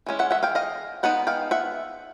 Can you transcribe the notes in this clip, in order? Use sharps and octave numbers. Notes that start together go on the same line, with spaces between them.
E3 G#3 C#4
E5 F#5
E5 F#5
F5 G5
D#5 F5
G#3 B3 D#4 F#5
F5 G5
E5 F#5